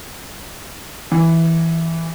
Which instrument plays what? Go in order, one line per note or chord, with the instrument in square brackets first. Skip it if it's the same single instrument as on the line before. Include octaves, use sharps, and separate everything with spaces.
[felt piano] E3